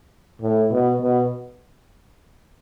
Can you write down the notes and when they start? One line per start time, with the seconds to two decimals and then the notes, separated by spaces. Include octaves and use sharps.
0.42 A2
0.71 B2
1.01 B2